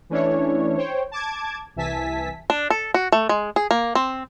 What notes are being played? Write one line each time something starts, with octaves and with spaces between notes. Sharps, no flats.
E3 A3 C#4 D4 E4 C#5
C5 C#5 G5
A5 D6 G#6
C2 E3 E5 G#5 A5 B6
D4
A4
F#4
A3
G#3
G#4
A#3
C4